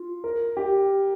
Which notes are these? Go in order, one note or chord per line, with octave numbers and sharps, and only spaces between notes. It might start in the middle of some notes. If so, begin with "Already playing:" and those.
Already playing: F4
A#4
G4